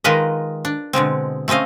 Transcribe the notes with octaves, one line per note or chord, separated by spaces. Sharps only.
D#3 G#3 F4 A#4 B4 D#5
D4
B2 D3 G#3 C4
A3 C4 C#4 D#5 F5